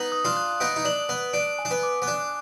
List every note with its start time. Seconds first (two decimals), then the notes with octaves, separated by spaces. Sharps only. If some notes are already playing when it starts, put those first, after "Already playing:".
Already playing: B3 D#4 F#7
0.12 D#6
0.25 D4 F4
0.37 F#6
0.60 B3 D#4 D7
0.76 D#4
0.85 D4 F#7
1.09 B3 D#6
1.33 D4 D7
1.59 G#5
1.65 D4
1.71 B3
1.83 D6
2.02 B3
2.07 D4 F#6